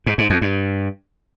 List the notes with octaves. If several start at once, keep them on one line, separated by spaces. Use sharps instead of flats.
G#2
G#2
F2
G2